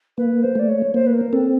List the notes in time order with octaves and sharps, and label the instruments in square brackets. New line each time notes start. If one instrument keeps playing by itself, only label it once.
[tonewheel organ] A#3 [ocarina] B4
[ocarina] C5
[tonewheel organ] A3 [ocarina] D5
[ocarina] C#5
[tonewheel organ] A#3 [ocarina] C5
[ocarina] B4
A#4
[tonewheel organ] C4 [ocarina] A4